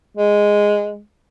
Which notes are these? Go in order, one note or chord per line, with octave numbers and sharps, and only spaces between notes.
G#3